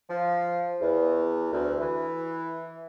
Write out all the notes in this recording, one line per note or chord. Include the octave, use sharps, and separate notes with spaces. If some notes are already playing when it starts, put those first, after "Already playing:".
F3
E2
D2
E3